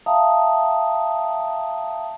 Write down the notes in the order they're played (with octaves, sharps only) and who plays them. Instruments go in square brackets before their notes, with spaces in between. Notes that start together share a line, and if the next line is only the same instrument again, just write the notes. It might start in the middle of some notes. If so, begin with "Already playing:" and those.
[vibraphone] E5 F5 G5 A5 A#5 D#6